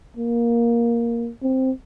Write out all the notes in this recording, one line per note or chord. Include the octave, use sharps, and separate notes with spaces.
A#3
C4